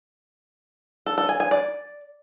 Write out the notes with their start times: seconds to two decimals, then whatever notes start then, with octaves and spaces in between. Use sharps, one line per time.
1.06 A4
1.18 A4
1.29 G#5
1.40 G#5
1.51 D5